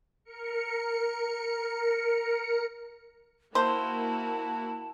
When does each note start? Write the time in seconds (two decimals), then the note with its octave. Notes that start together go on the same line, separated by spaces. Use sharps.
0.24 A#4 C#7
3.55 A#3 E4 F#4 C5 A5